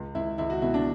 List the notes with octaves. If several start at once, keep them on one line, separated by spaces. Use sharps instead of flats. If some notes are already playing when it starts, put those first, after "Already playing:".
Already playing: C#2
C#2 E4
C#2 E4
F#4
B2 E4
D4